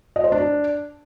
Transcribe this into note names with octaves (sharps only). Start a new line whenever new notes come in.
D#5
C5
D4